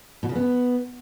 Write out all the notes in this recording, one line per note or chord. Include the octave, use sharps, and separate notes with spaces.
B2
C#3
B3